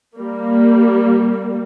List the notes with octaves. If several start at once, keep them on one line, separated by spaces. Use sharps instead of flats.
G3 A#3